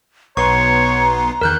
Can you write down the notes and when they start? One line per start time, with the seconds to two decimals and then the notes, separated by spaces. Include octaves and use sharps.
0.37 B1 B3 C#5 A#5 C6 C#6
1.41 E2 D#3 A#4 F#6 G6